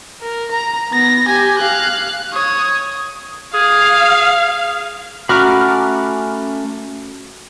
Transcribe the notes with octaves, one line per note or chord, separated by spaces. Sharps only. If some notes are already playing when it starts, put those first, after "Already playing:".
A#4
A#5
B3 A#6
G4 G#5
F5 F#6
C#5 D#6
G#4 F5
A3 C#4 F#4 A#5 B5 D6 F6